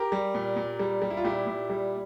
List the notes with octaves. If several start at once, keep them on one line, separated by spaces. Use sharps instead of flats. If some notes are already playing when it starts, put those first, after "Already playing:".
Already playing: G4 A#4
G3
A#2
A#2
G3
G3
E4
F4
A#2 E4 G4
A#2
G3